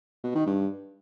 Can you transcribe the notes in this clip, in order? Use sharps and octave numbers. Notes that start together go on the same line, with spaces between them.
B2
D#3
G2